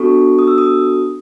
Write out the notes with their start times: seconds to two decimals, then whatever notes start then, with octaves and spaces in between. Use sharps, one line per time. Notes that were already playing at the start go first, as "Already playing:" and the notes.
Already playing: B3 D4 F#4 A4 C#6
0.39 D#6
0.48 E6
0.58 D#6